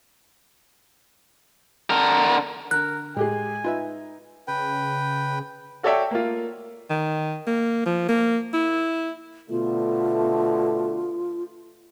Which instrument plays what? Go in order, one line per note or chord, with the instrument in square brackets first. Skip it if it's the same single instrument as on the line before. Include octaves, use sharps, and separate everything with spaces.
[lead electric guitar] D3 A#4
[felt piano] D3 [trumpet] A#4 [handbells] F#6
[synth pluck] A2 [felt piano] G#3 G4 G#4 [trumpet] G#5
[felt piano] D#4 [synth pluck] F4 B4 E5
[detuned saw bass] C#3 [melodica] B4 G5
[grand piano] F#4 A4 C#5 D5 E5 G5
A#3 F4
[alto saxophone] D#3
A#3
F3
A#3
E4
[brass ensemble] B2 D3 A3 [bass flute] F4